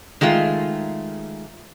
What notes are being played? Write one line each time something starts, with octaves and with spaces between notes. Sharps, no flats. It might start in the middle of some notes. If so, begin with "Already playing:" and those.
D#3 G#3 A3 F4